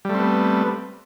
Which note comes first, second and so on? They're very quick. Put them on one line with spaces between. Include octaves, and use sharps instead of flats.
G3 A3 C4 B3